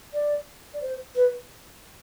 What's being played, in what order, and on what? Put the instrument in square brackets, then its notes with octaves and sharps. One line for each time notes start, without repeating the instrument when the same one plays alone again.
[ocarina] D5
D5
C5
B4